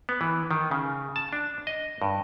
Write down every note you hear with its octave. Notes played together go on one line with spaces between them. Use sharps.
B3
E3
D#3
C#3
A5
D4
D#5
G2